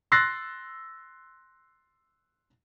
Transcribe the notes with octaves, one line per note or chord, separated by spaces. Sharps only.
C6 E6 F#6 A6 A#6 C7